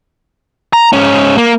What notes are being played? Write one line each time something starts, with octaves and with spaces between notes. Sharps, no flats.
A#5
G#2 C#4
A#3